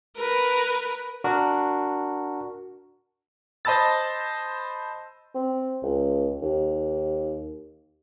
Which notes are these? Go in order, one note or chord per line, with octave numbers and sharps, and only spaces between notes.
A#4 B4
D4 F#4 A#4
C5 D#5 A5 B5 E6 A6
C4
C#2
D#2